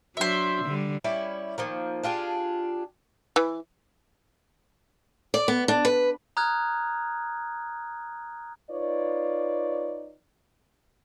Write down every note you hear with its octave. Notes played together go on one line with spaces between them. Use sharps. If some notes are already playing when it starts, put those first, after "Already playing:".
F#3 D4 C5 E5
D3 G3
G3 C#4 E4 D5
D#3 F3 A#3
D4 F4 G4 G#4
E3
D5
B3
D4
B4
A#5 D#6 F6 F#6 G#6
D#4 F4 B4 C#5 D5